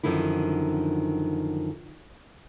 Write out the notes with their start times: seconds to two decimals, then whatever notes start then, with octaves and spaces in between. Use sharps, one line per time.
0.03 F#2 D3 D#3 F3 E4